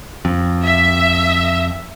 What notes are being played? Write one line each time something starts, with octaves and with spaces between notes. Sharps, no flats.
F2
E5